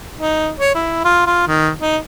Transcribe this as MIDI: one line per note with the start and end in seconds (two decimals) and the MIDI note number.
0.18 0.50 63
0.60 0.73 73
0.75 1.01 64
1.05 1.22 65
1.27 1.46 65
1.48 1.70 51
1.81 1.97 63